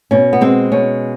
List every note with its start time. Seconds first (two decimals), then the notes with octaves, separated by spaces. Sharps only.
0.11 B2 C#4
0.33 B3
0.41 G#3 C4
0.72 B2 C#4